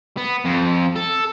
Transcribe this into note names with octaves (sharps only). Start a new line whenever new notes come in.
B3
F2
A4